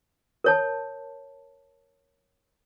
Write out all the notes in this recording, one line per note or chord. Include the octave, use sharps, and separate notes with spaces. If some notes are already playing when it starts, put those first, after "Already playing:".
A#4 C#5 A5